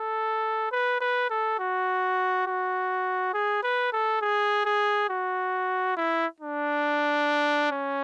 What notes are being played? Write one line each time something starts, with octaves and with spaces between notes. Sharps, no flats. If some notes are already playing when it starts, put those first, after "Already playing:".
Already playing: A4
B4
B4
A4
F#4
F#4
G#4
B4
A4
G#4
G#4
F#4
E4
D4
C#4